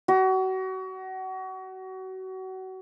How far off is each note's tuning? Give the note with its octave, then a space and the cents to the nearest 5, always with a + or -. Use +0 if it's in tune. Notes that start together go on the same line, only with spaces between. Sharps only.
F#4 +30